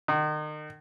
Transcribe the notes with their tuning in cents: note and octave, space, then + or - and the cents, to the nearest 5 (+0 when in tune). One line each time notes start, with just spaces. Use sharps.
D#3 -35